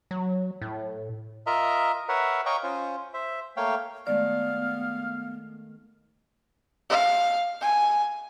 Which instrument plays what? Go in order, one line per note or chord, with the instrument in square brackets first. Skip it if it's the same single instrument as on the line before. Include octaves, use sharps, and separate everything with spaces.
[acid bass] F#3
A2
[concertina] F4 A#4 D#5 E5 A#5
A#4 B4 C#5 E5 F#5
C#5 D#5 F5 G5 A#5 C#6
C#4 F4 C5
C5 E5
A3 A#3 C#5 F5 G5
[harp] D#3 G#3 A3 [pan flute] B3 [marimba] D5 [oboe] F5
[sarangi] F5
G#5